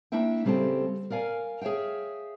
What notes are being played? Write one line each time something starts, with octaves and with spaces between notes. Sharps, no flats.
A#3 D4 E4 E5 G5
C#3 G3 C4 G4 A4
A#4 D5 F5 G#5
G#4 C#5 E5 F5 G5